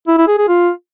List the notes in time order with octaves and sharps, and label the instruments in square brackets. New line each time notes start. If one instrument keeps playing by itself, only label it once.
[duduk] E4
E4
G#4
G#4
F4